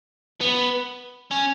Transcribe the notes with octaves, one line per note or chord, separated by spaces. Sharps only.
B3
C#4